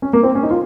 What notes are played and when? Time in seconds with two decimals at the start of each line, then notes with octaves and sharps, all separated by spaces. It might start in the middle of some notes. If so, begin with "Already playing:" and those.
0.02 C#4
0.13 A#3
0.23 C4
0.35 C#4
0.43 D#4
0.51 F4